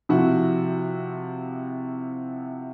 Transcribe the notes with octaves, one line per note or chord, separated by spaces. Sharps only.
C3 F3 E4 F#4